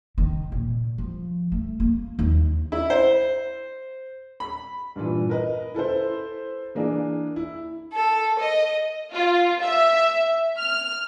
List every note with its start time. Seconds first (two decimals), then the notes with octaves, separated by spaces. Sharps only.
0.18 D#3
0.52 A#2
0.98 F3
1.52 A3
1.80 A#3
2.19 D#2
2.72 E4
2.90 C5
4.40 B5
4.96 G2 A#2 E3
5.29 A#4 B4 D#5
5.75 E4 A4 B4 C5
6.75 E3 A#3 D4 G#4
7.36 E4
7.92 A4
8.38 D#5
9.13 F4
9.62 E5
10.58 F6